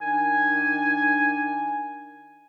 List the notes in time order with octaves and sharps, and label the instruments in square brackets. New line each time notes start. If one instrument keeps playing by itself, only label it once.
[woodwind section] D#3 D4 G#5